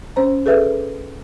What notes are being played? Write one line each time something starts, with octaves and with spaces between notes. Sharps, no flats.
C#4 C5 A#5
G#4 A4 B4 E5